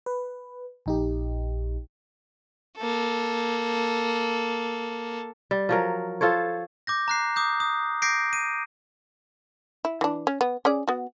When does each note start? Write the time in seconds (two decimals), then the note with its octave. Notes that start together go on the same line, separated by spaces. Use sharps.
0.06 B4
0.86 A#1 D#4 G4
2.78 A#3 A4
5.51 G3
5.69 F3 F#3 A#4
6.21 F4 A4 C5 C#5
6.87 D6 G6 A#6
7.08 A#5 F#6 C7
7.36 D6 D#6 G6
7.60 D#6
8.02 D6 G6 A#6 C7 D7
8.33 D#7
9.85 E4
10.01 E3 D4
10.27 C#4
10.41 B3
10.65 C#4 G#4 D5
10.88 B3 F#4